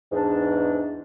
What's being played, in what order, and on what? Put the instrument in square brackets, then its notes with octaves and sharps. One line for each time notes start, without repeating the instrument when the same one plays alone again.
[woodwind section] E2 G#2 D4